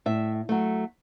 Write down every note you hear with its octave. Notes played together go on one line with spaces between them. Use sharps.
A2 E5
F#3 A3